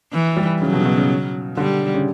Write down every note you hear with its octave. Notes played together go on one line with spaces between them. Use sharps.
E3
G3
C#3 F#3
B2
C#3
B2
C#3
D3 G3
C#3